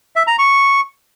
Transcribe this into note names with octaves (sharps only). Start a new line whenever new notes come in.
E5
A#5
C#6